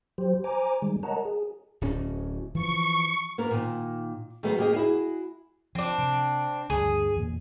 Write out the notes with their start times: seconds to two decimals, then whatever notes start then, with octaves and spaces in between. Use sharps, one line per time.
0.18 F#3 G4 C5
0.44 C5 G#5 A#5 D6
0.82 D#3 G3 G#3
1.03 A#4 C#5 D#5 F#5 A5 A#5
1.25 G#4
1.81 D1 D2 C#4
2.55 E3 F3 C#6
3.38 A#3 B3 A#4
3.51 A#2 D#3
4.43 D#3 F#3 G#3 A3 B3
4.58 D#3 A#3 G4 G#4 D#5
4.74 E4 F#4 G#4
5.75 F3 C4 D4
5.98 C3
6.70 D2 G2 G#4
7.16 E2 A#2